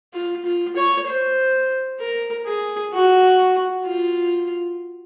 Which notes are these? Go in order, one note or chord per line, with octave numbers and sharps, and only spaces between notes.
F4
F4
C#5
C5
A#4
G#4
F#4
F4